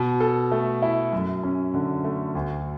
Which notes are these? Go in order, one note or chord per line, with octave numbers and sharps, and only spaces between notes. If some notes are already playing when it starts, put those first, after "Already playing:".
Already playing: B2
A4
A3
E4
F#2
C#4
D3
A3
D2